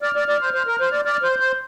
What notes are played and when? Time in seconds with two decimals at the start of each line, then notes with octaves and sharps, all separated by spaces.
0.02 D5 F6
0.16 D5
0.28 D5
0.41 C5
0.54 C5
0.67 A#4
0.80 C5
0.92 D5
1.05 D5 F6
1.23 C5
1.31 G6
1.40 C5